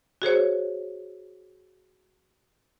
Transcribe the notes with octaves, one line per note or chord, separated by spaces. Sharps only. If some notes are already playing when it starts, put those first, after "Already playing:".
F#4 G#4 C5 C#5